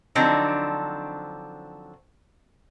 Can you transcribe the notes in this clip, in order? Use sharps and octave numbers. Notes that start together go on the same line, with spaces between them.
D3 F3 F#3 C4 D4 D#4